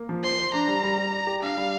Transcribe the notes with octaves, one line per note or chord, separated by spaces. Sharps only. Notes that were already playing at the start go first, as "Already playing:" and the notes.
Already playing: A#3
F3
C5 C6
C5
D4 A#5
G3
G3
G3
D5
G4
D4 F5
G3